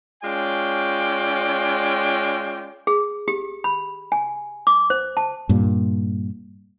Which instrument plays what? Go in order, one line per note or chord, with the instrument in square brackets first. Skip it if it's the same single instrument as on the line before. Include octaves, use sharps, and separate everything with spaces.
[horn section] G#3 C#4 F4 D5 G5
[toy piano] G#4
G4
B5
G#5
D6
C5
A5
[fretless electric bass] G2 A#2